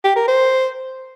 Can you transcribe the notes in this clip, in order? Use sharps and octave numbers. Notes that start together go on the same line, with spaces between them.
G4
A#4
C5